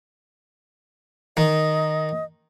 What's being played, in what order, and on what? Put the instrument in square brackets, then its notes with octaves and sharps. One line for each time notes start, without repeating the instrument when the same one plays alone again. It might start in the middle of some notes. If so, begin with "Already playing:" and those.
[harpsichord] D#3 [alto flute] D#5